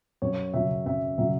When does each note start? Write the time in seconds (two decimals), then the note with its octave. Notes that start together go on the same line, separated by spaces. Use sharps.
0.22 F#2 C#5
0.54 C#3 F#3 E5
0.86 F#2 E5
1.18 C#3 F#3 E5